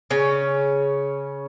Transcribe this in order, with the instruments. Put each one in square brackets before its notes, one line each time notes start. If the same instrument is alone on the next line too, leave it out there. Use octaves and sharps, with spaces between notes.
[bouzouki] C#3 C#4